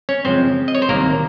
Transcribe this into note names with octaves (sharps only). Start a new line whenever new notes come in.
C#4 C#5
F#2 C#3 F3 G#3 C4 C5
D#5
C#5
C5
C2 C3 D#3 F#3 A#3 A#4